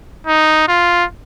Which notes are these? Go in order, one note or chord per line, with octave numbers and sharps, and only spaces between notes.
D#4
F4